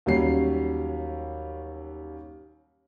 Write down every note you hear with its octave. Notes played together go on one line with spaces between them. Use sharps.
D#2 F#3 G3 C#4 C7